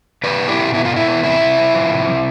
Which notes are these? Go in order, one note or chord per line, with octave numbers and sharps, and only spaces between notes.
B2 B4 D5
B3
E4 G4
B2
B3 E4
F4
B2
E4
B3
C3 E4
C3
C4
F3
C3
C3